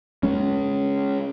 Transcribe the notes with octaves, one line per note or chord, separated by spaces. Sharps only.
G#3 C#4